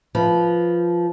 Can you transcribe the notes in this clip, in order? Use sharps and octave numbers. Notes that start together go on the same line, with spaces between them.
F3 B4